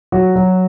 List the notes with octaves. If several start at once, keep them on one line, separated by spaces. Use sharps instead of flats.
F#3 F#4
F#3